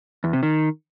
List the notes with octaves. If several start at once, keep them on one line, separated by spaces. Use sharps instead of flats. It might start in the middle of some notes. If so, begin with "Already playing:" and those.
E2
C3
D#3